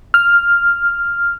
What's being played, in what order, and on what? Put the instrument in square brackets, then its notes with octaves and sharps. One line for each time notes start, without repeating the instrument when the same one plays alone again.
[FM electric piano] F6